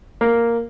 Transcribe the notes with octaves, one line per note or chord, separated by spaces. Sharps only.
A#3